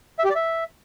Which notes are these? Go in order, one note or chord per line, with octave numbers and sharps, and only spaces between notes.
E5
G4
D5
E5